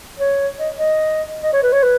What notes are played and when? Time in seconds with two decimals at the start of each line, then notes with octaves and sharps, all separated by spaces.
0.19 C#5
0.59 D#5
0.77 D#5
1.43 D#5
1.53 C#5
1.63 B4
1.72 C#5
1.83 B4